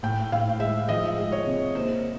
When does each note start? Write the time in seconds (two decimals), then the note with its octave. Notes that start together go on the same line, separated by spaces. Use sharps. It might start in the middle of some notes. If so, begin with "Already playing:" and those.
0.03 A2 G5
0.32 A2 F5
0.60 G#3 E5
0.89 F3 D#5
1.18 G#3
1.32 C#5
1.47 C3
1.75 A#3 C5